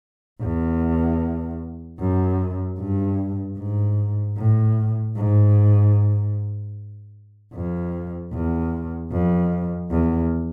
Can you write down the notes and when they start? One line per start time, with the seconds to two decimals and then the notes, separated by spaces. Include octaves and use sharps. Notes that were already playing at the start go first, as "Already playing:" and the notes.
0.41 E2
2.00 F#2
2.79 G2
3.58 G#2
4.37 A2
5.16 G#2
7.54 F2
8.33 E2
9.11 F2
9.91 E2